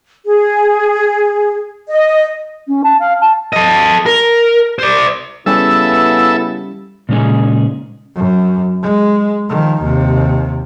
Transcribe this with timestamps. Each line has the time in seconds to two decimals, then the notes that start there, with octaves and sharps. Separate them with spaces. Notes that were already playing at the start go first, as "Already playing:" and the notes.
0.25 G#4
1.89 D#5
2.68 C#4
2.84 A5
3.00 F5
3.21 A5
3.53 A4 D#5
4.06 A#4
4.79 C5 D5
5.46 C#3 G3 B3 C#4 E4 G4 A4 E5
7.09 A#2 C#3 G#3 C#4 D#4 G#4
8.16 F#2
8.83 G#3
9.49 D#3 F3
9.83 D#2 C3